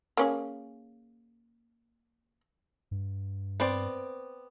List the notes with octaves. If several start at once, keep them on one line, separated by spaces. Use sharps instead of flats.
A#3 C#4 G#4
G2
B3 C4 D5